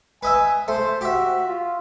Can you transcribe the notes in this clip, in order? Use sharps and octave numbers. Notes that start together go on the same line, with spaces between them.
B4 D#5 E5 G#5
A3 C5
F#4 G4 E5
F4